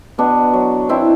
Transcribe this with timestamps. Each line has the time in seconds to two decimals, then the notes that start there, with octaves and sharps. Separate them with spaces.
0.18 B2 B3 D4
0.53 F#3
0.89 B2 C4 E4